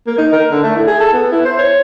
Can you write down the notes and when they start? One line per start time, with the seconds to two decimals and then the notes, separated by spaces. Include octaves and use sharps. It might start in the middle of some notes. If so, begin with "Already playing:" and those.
0.07 A#3
0.18 D#4
0.33 A#4
0.51 D3
0.64 A3
0.75 E4
0.87 G#4
1.00 A4
1.13 B3
1.32 E4
1.45 C5
1.59 C#5